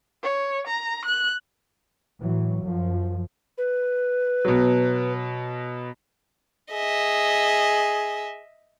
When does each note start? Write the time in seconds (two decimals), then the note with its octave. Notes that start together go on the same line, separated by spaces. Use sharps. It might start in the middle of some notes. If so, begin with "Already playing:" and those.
0.24 C#5
0.67 A#5
1.05 F#6
2.20 A2 E3 F#3
2.64 F#2 F3
3.58 B4
4.45 B2 F#3
6.72 G#4 D#5 E5